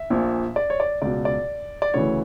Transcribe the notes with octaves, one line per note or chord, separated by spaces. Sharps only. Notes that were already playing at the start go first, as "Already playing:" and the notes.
Already playing: E5
A#1 A#2
D5
C#5
D5
C#2 B2 D5
D5
D5
D2 C#3 E3 C#5